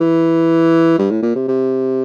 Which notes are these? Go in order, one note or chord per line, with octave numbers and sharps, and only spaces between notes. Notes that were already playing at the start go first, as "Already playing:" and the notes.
E3
G2
A2
A#2
C3
C3